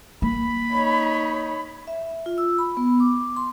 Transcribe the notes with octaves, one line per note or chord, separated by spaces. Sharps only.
A#3 B5
D#4 C#5
E5
F4
E6
B5
B3
D6
C6